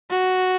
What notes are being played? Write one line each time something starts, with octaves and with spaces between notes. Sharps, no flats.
F#4